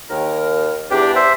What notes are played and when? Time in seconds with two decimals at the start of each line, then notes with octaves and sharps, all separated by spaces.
0.11 D#2 D#3 A#4
0.91 E2 G2 D4 G4
1.16 C5 E5